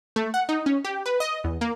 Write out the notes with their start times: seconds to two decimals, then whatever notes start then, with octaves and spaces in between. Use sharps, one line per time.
0.16 A3
0.34 F#5
0.49 D#4
0.66 C#4
0.84 G4
1.06 B4
1.20 D#5
1.44 E2
1.61 A#3